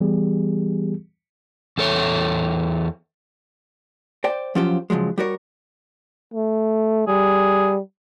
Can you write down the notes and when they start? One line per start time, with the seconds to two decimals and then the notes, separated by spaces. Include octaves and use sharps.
0.01 E3 G3 B3 G4 G#4
1.78 E2 A4 C#5
4.24 C5 D5 G5
4.55 F3 F#3 C#4 F4 G4 C5
4.90 C#3 F3 F#3 G#3
5.18 G3 F#4 A#4 C#5
6.34 A3
7.07 G3 G#4